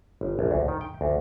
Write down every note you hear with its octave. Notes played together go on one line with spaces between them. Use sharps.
G1
A#1
D2
D#3
G5
D2